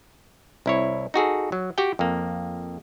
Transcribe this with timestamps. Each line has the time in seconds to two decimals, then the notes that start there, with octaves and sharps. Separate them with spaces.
0.66 C2 E4 C#5
1.14 D#4 F#4 G#4 A4
1.52 F#3
1.78 F#4 G4 G5
1.99 F2 A#3